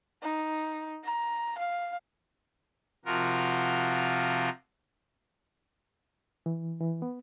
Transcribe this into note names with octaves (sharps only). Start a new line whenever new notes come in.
D#4
A#5
F5
C3 F3 F4 F#4 A#4
E3
E3
B3